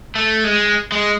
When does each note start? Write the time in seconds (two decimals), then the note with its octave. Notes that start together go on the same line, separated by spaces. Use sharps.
0.15 A3
0.44 G#3
0.92 G#3